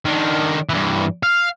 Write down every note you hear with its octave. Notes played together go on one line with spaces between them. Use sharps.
D#3 D4
G2 E3
F5